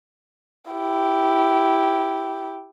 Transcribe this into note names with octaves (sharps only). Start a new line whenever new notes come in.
E4 G4